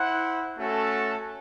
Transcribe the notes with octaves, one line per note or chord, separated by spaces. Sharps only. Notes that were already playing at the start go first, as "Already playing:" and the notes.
Already playing: E4 C5 F#5
A3 C#4 F#4 A4